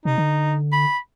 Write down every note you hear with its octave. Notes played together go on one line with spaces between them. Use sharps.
C3 D#4
D3
B5